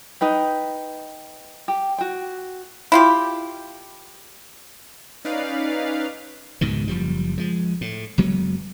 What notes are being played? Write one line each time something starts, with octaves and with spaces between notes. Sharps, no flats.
D#4 B4 G5
G4
F#4 G5
E4 F4 G4
C#4 D#4 B4 D5 F5
C#2 G#2 B2 D#3
F#1 F3 G3
F3 G#3
A2
F#1 F#3 G#3 B3